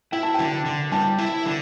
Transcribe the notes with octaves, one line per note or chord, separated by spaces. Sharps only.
E4 G5
A5
D3 G5
D3
G3 A5
E4
D3